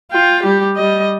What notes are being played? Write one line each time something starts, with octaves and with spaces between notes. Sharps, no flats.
F4 G5
G3 G4
G3 D#5